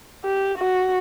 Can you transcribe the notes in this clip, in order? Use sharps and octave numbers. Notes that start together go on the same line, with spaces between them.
G4
F#4